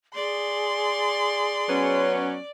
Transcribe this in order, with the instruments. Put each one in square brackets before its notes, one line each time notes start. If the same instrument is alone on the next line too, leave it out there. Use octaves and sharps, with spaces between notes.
[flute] G#4 [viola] D5 [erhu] C6
[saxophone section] F#3 B3 C#4